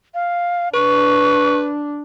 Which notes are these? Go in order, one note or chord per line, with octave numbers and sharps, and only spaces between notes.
F5
D4 B4 C#6